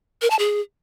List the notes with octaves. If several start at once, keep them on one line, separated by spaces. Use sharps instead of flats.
A#4
A5
G#4